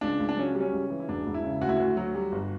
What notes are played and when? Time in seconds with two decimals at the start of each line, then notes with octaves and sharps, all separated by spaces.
0.01 C#2 D4
0.20 C#2
0.29 D4
0.37 F#3 C#4
0.55 G3
0.60 C#4
0.73 C#2
0.90 E3
1.00 E4
1.08 E1 D4
1.27 E1
1.34 E4
1.44 C#3
1.61 D2 F#4
1.69 E4
1.76 D2 F#4
1.97 F#3
2.15 G3
2.32 G1